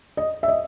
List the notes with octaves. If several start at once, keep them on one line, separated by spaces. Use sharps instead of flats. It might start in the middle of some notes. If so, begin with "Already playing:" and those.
D#5
E5
D#5